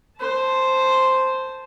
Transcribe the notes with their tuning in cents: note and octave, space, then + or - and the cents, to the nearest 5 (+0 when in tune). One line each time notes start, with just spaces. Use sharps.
C5 +0 A5 -5